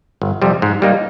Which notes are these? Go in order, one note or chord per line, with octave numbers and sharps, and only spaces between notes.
G1
F2 C3 G3
G#2
G3 A#3 D#4